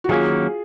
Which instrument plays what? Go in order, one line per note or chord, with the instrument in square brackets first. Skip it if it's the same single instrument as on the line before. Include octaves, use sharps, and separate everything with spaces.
[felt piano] F#4
[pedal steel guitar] D#3 F#3 A#3 C#4 [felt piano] F4 G#4